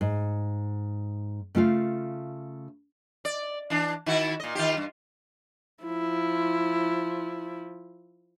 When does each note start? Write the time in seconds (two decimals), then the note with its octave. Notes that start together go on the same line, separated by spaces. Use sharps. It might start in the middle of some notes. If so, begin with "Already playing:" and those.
0.01 G#2
1.55 C#3 A3 F4 F5
3.25 D5
3.70 E3 D4
4.06 D#3 E4 F#4
4.40 A#2 D#5
4.55 D#3 F4 G4
4.77 G2
5.84 F3 E4